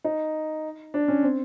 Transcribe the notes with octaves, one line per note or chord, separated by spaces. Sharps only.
D#4
D4
C#4
C4